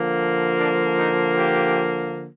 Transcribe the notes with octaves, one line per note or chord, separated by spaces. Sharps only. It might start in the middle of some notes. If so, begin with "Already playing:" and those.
Already playing: D3 F3 A#3
D4
D#4
G4